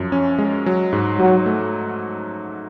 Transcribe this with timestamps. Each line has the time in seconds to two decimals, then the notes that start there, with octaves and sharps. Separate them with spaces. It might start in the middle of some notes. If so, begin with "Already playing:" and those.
Already playing: F#2 F3
0.12 C#4
0.38 G#3
0.66 F#3
0.93 G#2
1.19 G#2 F#3
1.46 A3